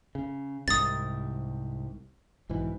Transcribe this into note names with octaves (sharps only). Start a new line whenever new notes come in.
C#3
C2 G#2 C3 D#6 A6
B1 G#2 E3